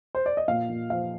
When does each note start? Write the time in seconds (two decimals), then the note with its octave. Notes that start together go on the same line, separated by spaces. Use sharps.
0.15 C5
0.26 D5
0.37 D#5
0.48 A#2 F5
0.69 A#2
0.90 F3 F5